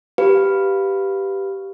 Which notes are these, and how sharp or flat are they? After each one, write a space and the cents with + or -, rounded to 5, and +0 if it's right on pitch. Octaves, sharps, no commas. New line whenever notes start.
G4 -5 B4 +0 F5 +0